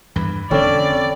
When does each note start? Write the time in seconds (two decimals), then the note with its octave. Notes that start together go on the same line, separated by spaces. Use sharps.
0.16 E2 G2 E3 B4
0.51 F1 D3 E3 C4 C#4 A4 D5 G5